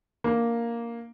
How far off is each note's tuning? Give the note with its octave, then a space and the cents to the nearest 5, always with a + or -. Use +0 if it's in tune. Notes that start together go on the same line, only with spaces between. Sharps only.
A#3 +0 D4 +0